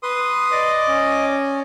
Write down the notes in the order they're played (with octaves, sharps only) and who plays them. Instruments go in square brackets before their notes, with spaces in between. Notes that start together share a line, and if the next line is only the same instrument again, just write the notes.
[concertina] B4 [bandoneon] C6 D#6
[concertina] D5 D#5 D6
[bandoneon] C#4